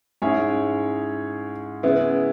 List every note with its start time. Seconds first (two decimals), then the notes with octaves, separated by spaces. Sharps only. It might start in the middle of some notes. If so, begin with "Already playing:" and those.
0.22 G#2 G#3 C#4 E4 G#4 C#5
1.83 C#3 G#3 B3 E4